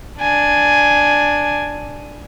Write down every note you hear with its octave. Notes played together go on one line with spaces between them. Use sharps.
D4 G#5